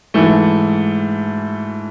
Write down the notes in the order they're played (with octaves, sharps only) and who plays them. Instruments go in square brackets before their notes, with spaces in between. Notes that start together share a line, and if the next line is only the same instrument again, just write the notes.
[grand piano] G#2 E3 A3